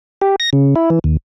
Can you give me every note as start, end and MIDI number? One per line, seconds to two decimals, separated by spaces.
0.22 0.36 67
0.40 0.50 94
0.53 0.75 49
0.76 0.90 64
0.90 0.99 52
1.04 1.17 39